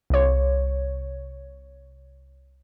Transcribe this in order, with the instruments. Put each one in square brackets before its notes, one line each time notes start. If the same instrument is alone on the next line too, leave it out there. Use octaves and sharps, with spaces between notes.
[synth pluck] C2 C#5